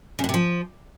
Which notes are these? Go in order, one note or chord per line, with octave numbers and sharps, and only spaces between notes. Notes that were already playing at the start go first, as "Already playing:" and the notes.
C#3
A2
C3
F3